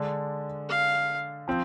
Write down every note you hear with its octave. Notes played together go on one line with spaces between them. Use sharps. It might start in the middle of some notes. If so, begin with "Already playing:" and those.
Already playing: D3 G#3 D4
F5
F3 C4